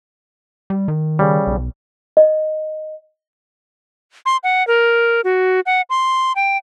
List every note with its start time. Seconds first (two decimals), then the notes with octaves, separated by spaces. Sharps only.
0.70 G3
0.88 D#3
1.19 C#3 G3
1.47 B1
2.17 D#5
4.26 C6
4.43 F#5
4.67 A#4
5.24 F#4
5.66 F#5
5.90 C6
6.36 G5